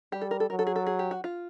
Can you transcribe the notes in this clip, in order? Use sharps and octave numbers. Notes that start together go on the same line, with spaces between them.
G3 G4
A4
A#4
A4
F#3 A#4
A4
G#4
A4
G#4
G4
F#4
F4